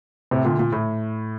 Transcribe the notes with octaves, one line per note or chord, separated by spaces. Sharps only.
A2 C3
A#2 D3
A#2
A2